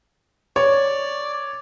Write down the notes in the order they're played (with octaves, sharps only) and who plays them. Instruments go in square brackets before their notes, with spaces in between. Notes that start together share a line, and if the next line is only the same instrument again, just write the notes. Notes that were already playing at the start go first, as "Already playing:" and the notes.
[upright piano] C#5 [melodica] D5